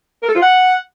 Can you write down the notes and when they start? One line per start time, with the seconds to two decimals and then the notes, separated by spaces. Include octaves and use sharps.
0.23 A#4
0.29 A4
0.35 F4
0.41 F#5